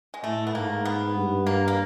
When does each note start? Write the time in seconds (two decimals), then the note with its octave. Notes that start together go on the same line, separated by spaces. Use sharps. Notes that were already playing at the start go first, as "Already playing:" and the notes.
0.14 G#3
0.23 A2 A3
0.47 B3
0.54 G#2 A#3
0.85 B3
1.16 G2
1.47 A#3
1.68 A#3